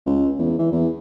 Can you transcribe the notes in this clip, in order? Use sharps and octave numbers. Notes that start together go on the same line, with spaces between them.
C#2
E2
E3
E2